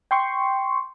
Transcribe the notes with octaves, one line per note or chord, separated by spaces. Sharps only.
G5 C6 C#6